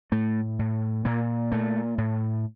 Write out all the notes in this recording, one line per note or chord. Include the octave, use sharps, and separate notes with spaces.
A2 A3
A2
A#2 A#3
A#2 A3
A2